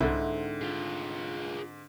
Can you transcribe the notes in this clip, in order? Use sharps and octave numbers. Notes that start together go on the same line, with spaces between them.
C2 G#2 D3 C4 E4
F4 G#4